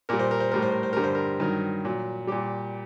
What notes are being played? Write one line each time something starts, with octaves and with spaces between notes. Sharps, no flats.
A#2 G3 A#4
C5
A#4
C5
A2 G3 A#4
C5
A#4
C5
G2 D3 G3 A#4
C5
A#4
G2 D#3 F#3 A#4
A#2 F#3
A#2 G3 G4